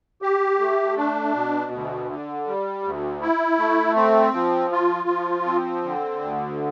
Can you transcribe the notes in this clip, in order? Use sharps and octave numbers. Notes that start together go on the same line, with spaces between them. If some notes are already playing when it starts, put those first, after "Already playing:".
G4
A3
D4
B2
D2
D3
G3
D2
E4
A3
C4
F3
F4
F3
C4
D3
D2